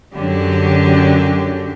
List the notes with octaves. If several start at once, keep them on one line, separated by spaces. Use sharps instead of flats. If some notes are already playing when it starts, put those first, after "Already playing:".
F#2 D3 F#3 G4